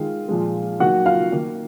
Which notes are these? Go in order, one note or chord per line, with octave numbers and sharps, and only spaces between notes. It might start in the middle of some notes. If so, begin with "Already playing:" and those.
Already playing: D#3 G#3 F4
A#2 F3 G#3
D#3 F#3 A#3 F#4 F#5
F4 F5
D#3 A#3